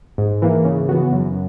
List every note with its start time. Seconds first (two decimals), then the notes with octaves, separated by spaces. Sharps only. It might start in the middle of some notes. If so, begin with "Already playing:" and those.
0.18 G#2
0.42 E3 A#3
0.65 C#3
0.89 E3 B3 F#4
1.13 F#2